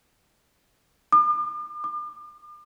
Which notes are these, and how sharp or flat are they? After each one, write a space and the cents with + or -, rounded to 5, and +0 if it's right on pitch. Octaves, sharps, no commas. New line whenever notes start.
D6 +45
D6 +40